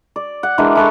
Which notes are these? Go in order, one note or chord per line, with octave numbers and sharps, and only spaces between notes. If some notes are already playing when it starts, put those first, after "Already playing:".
D5
F#5
E3 G#3 D4 A#4
E4 A4 B4 C#6